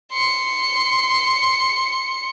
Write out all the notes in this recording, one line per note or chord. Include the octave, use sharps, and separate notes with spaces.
C6 C#7